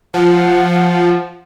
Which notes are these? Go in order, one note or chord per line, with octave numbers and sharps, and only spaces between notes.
F3 F#5